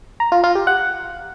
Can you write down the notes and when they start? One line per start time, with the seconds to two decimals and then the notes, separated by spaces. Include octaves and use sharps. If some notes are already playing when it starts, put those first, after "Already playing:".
0.20 A#5
0.32 F4
0.44 F4
0.55 G4
0.67 F#5